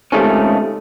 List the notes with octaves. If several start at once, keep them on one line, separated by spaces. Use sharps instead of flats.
C#2 C3 D#3 A3 C#4